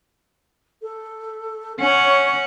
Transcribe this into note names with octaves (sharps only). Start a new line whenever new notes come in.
A4
C#4 C#5 F#5